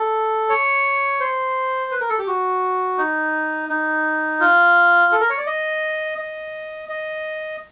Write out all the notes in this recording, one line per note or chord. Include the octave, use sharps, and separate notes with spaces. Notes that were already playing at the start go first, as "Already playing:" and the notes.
Already playing: A4
C#5
C5
B4
A#4
A4
G4
F#4
D#4
D#4
F4
A4
A#4
C#5
D5
D#5
D#5
D#5